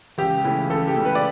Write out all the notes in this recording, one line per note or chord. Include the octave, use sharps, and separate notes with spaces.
C#2 G4
C#3 E3 A3
C#2 A4
G4
C#3 E3 A3
B4
D5